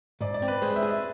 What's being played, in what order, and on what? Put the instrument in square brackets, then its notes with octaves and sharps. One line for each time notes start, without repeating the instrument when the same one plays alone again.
[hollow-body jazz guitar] G#2 [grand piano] D5
[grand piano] D5
[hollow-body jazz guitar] C4
[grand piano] B4
[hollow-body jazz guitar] G#3 [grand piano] C5
[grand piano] E5
[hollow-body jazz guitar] G#4
[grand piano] E5